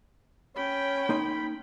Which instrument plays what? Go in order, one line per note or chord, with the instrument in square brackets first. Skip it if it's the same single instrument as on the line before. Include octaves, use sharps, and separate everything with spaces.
[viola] C#4 G5 [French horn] C#5 [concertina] B5
[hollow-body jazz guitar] A#3 D#4 C6